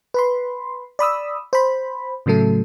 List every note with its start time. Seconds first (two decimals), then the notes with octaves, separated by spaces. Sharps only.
0.14 B4 B5 C6
0.99 D5 B5 D#6 E6
1.53 C5 B5
2.26 A2 C#3 F#3 A3 A4